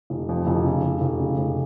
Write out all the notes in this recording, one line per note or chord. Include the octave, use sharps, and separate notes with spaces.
F1
F2
F1
C#3
F1
F1
C#3
F1